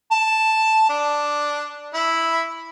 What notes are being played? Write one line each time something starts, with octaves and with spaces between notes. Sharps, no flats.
A5
D4
E4